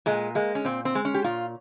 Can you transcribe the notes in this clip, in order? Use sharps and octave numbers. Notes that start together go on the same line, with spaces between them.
A#2 G#3
G#3 A#3
C#4
A#2 C4
C4
G#3
C#4
G4
A#2 F4